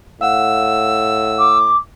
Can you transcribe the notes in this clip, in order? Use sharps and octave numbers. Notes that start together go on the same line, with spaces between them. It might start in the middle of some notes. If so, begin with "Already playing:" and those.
A2 F5 F#5 E6
D6